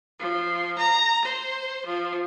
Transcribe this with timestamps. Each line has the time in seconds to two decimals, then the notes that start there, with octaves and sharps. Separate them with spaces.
0.19 F3
0.77 A#5
1.24 C5
1.86 F3